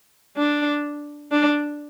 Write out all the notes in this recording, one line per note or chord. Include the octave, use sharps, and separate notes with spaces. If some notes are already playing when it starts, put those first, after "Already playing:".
D4
D4